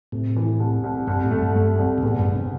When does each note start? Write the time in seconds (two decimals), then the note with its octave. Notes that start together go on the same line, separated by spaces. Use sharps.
0.12 A2 C3
0.37 E3
0.60 C2
0.84 C2
1.07 C2 G2
1.24 A2
1.31 A3
1.39 G2
1.56 A3
1.79 C2
1.98 C3
2.03 E2 A2
2.19 G2
2.27 D3
2.35 C3